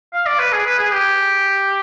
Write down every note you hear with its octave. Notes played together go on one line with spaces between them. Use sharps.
F5
D5
B4
G#4
B4
G#4
G4